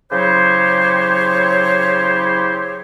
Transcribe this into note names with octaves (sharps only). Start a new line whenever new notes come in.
C#3 F#3 E4 G4 C5 C#5